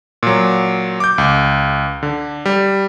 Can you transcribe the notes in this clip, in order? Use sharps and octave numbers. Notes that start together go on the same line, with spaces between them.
A#2 F#3
D6 G6
C#2 D6
D3
G3